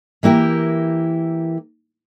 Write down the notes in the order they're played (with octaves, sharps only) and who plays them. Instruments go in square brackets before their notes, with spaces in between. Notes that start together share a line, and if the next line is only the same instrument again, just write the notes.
[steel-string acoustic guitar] E3 A#3 E4 G4 A#4